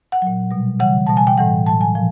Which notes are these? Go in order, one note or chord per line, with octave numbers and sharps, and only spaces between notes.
F#5
A#2 F#3
B2 G3
C#3 E3 G3 F#5
B2 G3 A5
G#5
G5
A2 E3 G3 F#5
A2 F#3 A5
G#5
A#2 F3